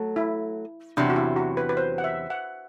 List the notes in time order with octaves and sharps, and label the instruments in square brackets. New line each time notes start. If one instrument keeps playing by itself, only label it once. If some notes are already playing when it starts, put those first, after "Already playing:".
Already playing: [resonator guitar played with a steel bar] F#3 A3
[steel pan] E4
[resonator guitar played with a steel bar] E2 C3 F#3 [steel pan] D4
[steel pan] F#4
E4
F#4
B4
B4
C5
F#5
E5
F#5